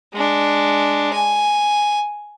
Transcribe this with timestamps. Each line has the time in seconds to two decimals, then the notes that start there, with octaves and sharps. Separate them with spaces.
0.14 G#3 D4
1.14 G#5